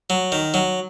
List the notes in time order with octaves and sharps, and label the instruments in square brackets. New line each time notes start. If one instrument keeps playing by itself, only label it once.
[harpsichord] F#3
D#3
F#3